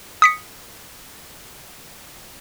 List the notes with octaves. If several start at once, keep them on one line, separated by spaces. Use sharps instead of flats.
D#6 B6 C#7